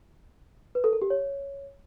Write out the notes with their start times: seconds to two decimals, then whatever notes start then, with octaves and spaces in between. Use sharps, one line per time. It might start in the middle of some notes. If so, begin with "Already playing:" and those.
0.75 B4
0.84 A4
0.93 A#4
1.02 G4
1.10 C#5